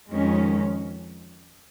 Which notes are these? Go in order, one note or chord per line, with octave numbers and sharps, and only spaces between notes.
F2 D#3 G#3 C#4